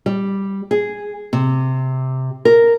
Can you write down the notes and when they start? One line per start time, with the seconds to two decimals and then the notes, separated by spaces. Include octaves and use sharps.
0.06 G3
0.71 G#4
1.33 C3
2.45 A#4